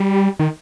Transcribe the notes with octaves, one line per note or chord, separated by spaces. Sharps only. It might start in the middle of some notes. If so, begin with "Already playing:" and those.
Already playing: G3
D#3